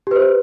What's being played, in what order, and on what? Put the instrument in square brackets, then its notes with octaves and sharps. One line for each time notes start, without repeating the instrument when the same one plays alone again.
[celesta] G4
B4
C5